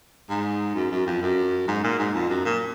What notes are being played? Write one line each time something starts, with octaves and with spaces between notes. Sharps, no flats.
G#2
F#2
F#2
F2
F#2
G#2
A#2
G#2
F2
F#2
A#2